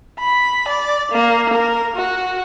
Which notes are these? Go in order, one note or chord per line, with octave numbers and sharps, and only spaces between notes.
B5
D5
A#3
A#4
F#4